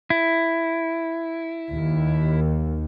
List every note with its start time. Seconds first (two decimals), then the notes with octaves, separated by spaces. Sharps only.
0.10 E4
1.74 D#2